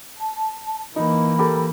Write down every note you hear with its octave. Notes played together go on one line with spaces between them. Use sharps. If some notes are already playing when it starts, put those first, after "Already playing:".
A5
E3 A#3 D#4 B5
G4 A4 A#4